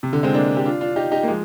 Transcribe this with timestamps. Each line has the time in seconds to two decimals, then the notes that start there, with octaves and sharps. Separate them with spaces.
0.03 C3
0.13 D3
0.23 G#3 C4
0.34 A#3 D4
0.57 G4
0.65 D4 F4
0.81 D4 F4
0.96 D#4 G4
1.11 D#4 G4
1.23 A#3
1.28 F3 G#3